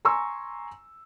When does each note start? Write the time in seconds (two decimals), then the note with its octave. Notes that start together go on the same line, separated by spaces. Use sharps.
0.05 G#5 A#5 C6 C#6 E6